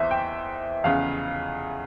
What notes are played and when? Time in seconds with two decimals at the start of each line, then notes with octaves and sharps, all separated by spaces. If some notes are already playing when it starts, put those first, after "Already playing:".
Already playing: E2 E3 C5 E5
0.11 G5
0.84 F1 E2 C#3 F5